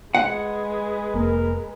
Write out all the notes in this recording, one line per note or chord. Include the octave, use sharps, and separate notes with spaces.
G#3 B4 F#5
F1 A#3 A#4